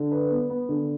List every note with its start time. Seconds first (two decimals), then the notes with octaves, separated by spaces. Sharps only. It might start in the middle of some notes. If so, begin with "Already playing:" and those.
Already playing: D3
0.12 B4
0.31 B3
0.50 B3
0.69 D3